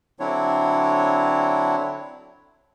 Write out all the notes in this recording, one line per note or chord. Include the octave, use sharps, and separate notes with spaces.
D3 F#3 C4 D4 E4 C#5